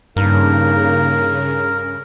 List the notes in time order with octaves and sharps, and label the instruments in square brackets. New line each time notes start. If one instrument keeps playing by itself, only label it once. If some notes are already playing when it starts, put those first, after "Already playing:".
[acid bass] G2 [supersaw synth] C#3 [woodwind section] A#3 D#4 [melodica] A#4